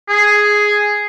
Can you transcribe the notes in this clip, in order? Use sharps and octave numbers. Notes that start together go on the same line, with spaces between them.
G#4